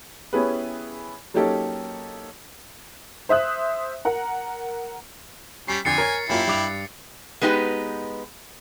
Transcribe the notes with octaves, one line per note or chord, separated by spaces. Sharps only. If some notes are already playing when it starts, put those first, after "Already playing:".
B3 C#4 E4 G4 G#4 B4
F#3 A#3 C#4 D#4 G4 A4
C5 E5 D#6 F#6
A#4 F#5 A#5
G3 C#4 B6 C7
F2 D3 G#5 A6 C7 C#7
A#4 C#5 G#6
F#2 A#3 E4 F4 G4
G2 D6 F7
G#3 B3 D#4 G4 B4